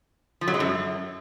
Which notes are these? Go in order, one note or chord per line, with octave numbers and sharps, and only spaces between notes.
F3
F#3
G#3
F#2